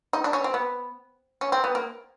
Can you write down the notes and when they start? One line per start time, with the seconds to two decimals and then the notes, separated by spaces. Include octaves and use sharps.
0.13 D#4
0.24 D4
0.33 C#4
0.44 C4
0.54 B3
1.41 C#4
1.52 C4
1.64 B3
1.75 A#3